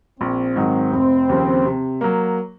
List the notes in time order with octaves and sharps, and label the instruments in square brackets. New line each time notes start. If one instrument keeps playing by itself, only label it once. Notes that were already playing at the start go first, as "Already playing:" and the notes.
[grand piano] A#1 [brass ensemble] C4
[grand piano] G#2 D#3 F#3
[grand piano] F1 [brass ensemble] C4
[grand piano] D#2 C#3 F3
C3
F#3 A#3